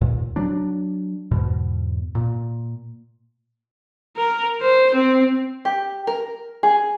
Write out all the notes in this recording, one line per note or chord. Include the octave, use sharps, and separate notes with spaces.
D#2 A#2
F#3 D4
E2 G#2 B2
A#2
A#4
C5
C4
G4
A#4
G#4